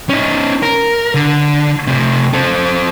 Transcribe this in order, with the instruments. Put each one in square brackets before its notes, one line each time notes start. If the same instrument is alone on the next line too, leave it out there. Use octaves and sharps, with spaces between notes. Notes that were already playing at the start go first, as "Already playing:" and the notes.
[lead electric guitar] C#4 D#4
A#4
D3
C3 A3
C4 A4